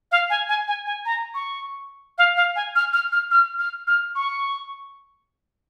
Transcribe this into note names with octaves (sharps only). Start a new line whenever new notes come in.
F5
G#5
G#5
G#5
G#5
A#5
C#6
F5
F5
G#5
F6
F6
F6
F6
F6
F6
C#6